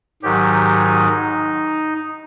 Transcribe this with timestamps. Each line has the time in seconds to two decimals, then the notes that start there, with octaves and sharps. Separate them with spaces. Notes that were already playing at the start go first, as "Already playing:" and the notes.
0.23 G#2 D#3 F#3 G4
0.84 D#4